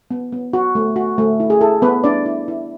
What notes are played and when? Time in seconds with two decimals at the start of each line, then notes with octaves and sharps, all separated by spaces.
0.11 B3
0.32 B3
0.53 F#4
0.75 A3
0.96 F#4
1.18 A3
1.40 E4
1.50 G#4
1.61 E4 A4
1.82 B3 B4
2.04 D4 E4 D5
2.26 E4
2.48 E4